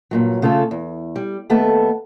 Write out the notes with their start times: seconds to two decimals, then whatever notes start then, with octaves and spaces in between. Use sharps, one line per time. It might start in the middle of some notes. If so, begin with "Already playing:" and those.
0.11 G2 A#2 F#3
0.42 C#3 A3 F4 G4 A4
0.71 E2
1.16 G3
1.50 D#2 A3 B3 A4 A5